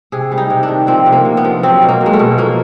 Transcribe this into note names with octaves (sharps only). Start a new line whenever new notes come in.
C3 G#4
G3
D#4
C3
D4
D#3
F3 C4
C3
A#3
C3
B3
F3
F#3 C4
B2
A#3
F#3
G#3
A3
B2
F3 A#3